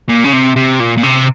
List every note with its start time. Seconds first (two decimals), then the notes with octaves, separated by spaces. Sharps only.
0.09 A#2
0.24 C#3
0.33 C3
0.56 C3
0.80 A#2
0.98 A#2
1.03 C3